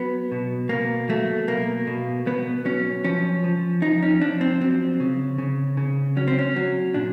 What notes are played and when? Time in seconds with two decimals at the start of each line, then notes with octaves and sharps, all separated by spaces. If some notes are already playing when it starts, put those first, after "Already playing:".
Already playing: F#3 B3
0.32 B2
0.69 B2 A#3
1.09 F#3 A3
1.48 B2 A#3
1.87 B2
2.27 B2 B3
2.65 F#3 C#4
3.04 F3 C#4
3.44 F3
3.82 F3 D#4
4.03 C#4
4.22 F3 D4
4.41 C4
4.61 F#3 C4
5.00 C#3
5.38 C#3
5.77 C#3
6.17 F#3 C#4
6.28 C4
6.39 C#4
6.56 F#3
6.94 A#2 D4